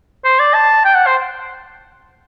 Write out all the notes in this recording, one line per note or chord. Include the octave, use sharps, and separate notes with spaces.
C5
D5
A5
G5
F#5
C5